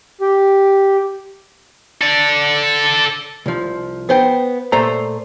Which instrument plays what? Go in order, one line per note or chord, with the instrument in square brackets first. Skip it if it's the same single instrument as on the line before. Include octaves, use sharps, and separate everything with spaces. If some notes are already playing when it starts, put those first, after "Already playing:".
[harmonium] G4
[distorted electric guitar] A4 D5
[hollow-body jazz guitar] C2 F3
B3 C5 G5
A#2 A3 C5 E5 A#5